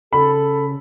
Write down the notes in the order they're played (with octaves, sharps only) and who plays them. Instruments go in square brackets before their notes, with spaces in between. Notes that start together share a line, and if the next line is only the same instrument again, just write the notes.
[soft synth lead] C#3 [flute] A4 [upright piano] B5